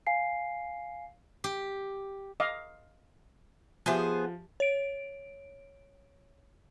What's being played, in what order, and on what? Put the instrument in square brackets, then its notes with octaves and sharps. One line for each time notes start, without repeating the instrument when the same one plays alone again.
[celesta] F5 G#5 C7
[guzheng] G4
[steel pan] D#5 F5 [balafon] D6
[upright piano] F3 [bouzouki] B3 G#4 C5 [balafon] G4 E5 G#5
[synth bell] C#5 D7